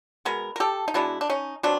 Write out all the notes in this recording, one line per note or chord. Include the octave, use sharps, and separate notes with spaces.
B2 G#3 B3 A#4
A#4
G4 A4
D#4
B2 G#3 B3 D4 E4
D4
C#4 D#4
B2 F#3 C4 D4